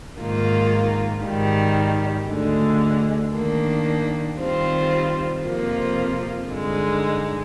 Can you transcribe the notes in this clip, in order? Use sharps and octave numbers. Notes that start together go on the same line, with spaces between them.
G#2 D#3 A#3 F4
G#2 D#3 G3
D2 D3 G#3
D#3 A#3 D4
D#3 G3 C4 F4
F2 C3 F3 A#3 F4
G2 D3 G#3 D#4